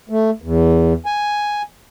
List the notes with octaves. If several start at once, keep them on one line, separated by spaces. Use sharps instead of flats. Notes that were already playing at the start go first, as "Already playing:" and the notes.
A3
E2
G#5